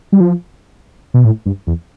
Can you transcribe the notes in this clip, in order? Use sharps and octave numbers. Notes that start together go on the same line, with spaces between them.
G3
F3
B2
A2
G2
E2